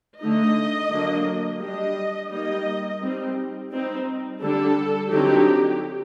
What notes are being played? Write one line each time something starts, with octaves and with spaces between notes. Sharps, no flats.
D3 A3 D#4 D#5
D3 F#3 A#3 D4
G3 D4 D#5
G3 A#3 D#4 D#5
G3 C4 D#4
G3 C4 D#4
D3 G3 D4 A4
D3 F#3 C4 D#4 G4